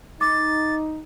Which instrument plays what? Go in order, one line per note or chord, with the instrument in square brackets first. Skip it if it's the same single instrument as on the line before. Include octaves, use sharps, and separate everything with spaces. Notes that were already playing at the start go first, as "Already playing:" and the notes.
[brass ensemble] D#4 [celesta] D6 [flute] A6